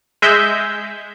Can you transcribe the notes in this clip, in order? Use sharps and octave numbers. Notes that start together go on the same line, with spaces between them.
G#3 E5 G6